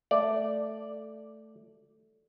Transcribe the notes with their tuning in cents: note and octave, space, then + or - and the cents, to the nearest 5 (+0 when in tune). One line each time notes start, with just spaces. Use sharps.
A3 +0 D5 +0